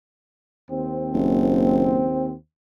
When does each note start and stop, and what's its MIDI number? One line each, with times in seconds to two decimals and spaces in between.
0.70 2.32 39
0.70 2.32 60
1.14 2.11 30